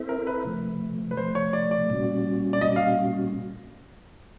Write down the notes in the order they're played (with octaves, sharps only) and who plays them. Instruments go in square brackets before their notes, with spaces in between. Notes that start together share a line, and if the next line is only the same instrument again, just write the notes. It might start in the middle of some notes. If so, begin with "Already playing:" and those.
Already playing: [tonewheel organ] C4 E4 A4 C5 E5
[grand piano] A#4
B4
[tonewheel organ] C3 F3 A3
[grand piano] B4
[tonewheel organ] C3 F3 A3 [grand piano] C5
[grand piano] C#5
D5
D5
[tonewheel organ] A#2 G3 A#3 C#4 F#4
[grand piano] D5
[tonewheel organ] A#2 G3 A#3 C#4 F#4 [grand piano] D#5
[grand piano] F5